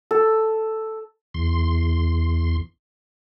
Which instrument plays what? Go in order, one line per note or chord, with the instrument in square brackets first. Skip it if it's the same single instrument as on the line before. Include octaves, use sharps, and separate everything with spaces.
[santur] A4
[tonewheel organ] E2 C6